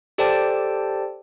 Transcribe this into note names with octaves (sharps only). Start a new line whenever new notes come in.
G4 A4 C5 D5 G5 A5